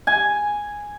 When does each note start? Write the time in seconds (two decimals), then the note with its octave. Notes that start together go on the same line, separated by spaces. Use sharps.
0.07 G#5